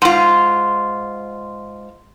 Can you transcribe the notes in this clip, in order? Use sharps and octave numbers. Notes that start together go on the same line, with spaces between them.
G#2 F4